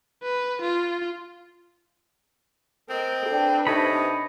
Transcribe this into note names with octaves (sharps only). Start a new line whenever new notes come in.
B4
F4
C4 A#4 D#5
D4 A4 B4 D5 G5
C3 D#4 A4 C#5 D#5 A5 B5